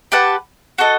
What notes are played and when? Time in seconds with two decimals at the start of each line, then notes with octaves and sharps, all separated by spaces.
0.12 G4 B4 F#5 A5
0.78 F#4 A4 D#5